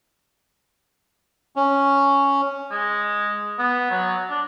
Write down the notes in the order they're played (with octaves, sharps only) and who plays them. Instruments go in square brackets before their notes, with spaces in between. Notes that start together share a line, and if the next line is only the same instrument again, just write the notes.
[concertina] C#4
[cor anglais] G#3
B3
F#3
D4